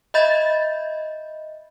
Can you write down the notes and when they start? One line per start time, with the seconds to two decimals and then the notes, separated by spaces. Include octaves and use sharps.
0.14 D#5 E5 B5 G6 A6